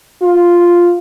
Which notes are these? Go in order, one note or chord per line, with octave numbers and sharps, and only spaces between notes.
F4